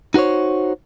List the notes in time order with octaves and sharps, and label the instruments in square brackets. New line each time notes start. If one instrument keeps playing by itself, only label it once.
[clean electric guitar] D#4 F#4 A#4 C5 C#5